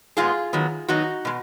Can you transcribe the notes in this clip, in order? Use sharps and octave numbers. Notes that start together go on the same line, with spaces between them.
A#2 G#3 B3 F4 G#4
D#3 F#3 B3
D#3 F#3 B3 D#4 F#4
B2 G#3